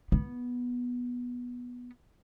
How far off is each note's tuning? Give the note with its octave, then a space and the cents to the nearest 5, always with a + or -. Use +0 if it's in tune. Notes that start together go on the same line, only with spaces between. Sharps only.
B3 -10